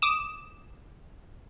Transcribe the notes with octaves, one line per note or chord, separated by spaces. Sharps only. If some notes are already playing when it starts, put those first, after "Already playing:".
D6 D#6 E7